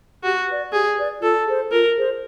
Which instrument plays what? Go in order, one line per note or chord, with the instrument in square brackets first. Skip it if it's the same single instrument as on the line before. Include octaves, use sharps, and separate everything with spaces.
[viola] F#4 [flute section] G4
[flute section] B4 D5
[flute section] G4 [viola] G#4
[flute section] B4 D5
[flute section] F4 [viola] A4
[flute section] G#4 C5
[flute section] F4 [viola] A#4
[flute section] G#4 C5